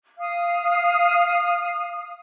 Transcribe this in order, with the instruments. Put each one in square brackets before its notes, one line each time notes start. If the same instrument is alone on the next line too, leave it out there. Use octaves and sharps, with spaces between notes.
[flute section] F5 D#6 F6